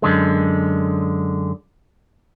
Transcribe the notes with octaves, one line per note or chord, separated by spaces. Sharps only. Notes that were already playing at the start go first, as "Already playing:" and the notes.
F#2 D3 G#3